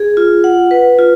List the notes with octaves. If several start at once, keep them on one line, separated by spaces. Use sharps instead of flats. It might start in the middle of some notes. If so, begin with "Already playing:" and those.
Already playing: G#4
F4
F#5
B4
F4